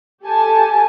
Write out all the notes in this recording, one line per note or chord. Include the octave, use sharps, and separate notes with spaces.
G4 A4 G#5 A5